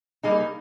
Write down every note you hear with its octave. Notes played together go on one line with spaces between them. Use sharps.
G3 A#3 D#4 G#4